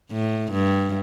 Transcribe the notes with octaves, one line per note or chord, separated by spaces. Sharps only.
A2
G2